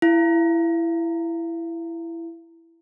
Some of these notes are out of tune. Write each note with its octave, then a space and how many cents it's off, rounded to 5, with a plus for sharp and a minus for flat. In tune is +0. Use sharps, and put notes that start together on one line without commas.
E4 +15 F5 -30